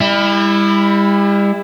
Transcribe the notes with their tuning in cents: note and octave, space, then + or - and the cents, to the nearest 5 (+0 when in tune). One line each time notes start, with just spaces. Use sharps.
G3 +40 E4 +0